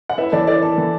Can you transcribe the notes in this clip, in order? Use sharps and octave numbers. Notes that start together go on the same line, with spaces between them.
F#5
E4 B4 E5
E3 A4 D5
E4 A4 D5
E4 A4
E3